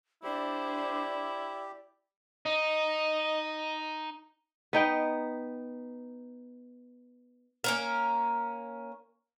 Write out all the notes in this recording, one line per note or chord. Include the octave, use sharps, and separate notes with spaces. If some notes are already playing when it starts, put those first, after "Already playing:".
D4 E4 G4 C5 D5
D#4 D#5
B3 D#4 G5
A#3 C#4 A#4